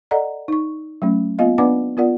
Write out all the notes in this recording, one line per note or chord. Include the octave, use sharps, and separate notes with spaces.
A4 D5 D#5 F#5 A#5
D#4 C#6
F#3 A3 C#4
A#3 B3 F4 D#5 F5
B3 D4 B4 D5 F#5 D6
B3 F4 A#4 D5 F#5